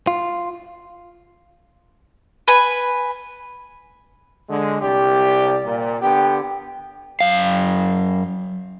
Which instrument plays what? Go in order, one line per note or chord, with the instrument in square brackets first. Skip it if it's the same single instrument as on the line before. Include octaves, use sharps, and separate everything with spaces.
[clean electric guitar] F4
[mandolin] B4 G#5
[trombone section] D3 G#3
[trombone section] C2 G4 [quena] D5
[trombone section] A#2
[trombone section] D3 B3 G4 [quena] G5
[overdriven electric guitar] F#2 F5